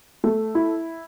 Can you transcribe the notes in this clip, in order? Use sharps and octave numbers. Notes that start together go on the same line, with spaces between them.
A3
E4